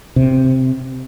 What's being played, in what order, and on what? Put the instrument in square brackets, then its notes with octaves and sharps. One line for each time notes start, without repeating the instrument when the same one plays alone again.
[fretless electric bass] C3